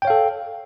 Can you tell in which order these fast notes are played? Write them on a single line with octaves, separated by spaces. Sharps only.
G5 C#5 F5 A4